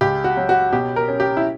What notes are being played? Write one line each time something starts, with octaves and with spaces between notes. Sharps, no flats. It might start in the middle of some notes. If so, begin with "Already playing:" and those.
C#2 G4
F#4
F#3
F#4
B2 G4
A#4
C#4
G4
E4